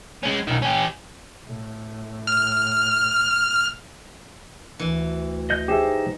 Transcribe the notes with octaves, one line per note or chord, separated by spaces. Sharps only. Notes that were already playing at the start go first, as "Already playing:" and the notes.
G#3 C#4
B1 D#3
C#4 G4
A2
F6
D2 E3
D#5 G6
D#4 G4 G#4 C5 E5